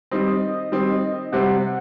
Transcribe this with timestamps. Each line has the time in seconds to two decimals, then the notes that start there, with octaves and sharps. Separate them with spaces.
0.11 D#3 G3 C4 D#5
0.72 D#3 G3 C4
1.32 C3 G3 C4 F#5